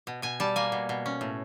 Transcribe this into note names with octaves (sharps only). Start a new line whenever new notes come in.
B2
B2 G#5
G3 A5
A#3 G#5
B2
B2
C#4
A2